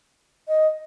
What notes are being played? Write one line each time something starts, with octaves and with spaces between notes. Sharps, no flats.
D#5